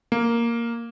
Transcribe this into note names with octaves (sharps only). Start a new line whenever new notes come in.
A#3